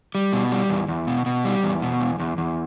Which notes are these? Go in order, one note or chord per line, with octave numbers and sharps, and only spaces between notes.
G3
B2
G3
E2
E2
B2
B2
G3
E2
B2
E2
E2
E2